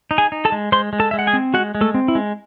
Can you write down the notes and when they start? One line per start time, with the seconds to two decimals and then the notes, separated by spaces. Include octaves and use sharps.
0.11 D#4
0.18 G#4 G#5
0.32 D#4
0.45 A4 A5
0.52 G#3
0.72 G#3 C5 C6
0.93 G#3
1.00 A4 A5
1.11 G#3 E5
1.19 F#5
1.27 G#4 G#5
1.33 C4
1.54 G#3 F#4 F#5
1.75 G#3
1.81 A3 A4
1.94 C4
2.08 E4
2.15 G#3